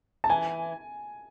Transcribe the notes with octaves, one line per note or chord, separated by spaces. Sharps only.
A5
E3 G#5